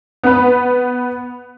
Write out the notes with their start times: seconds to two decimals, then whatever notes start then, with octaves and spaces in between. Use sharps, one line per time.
0.23 B3 B4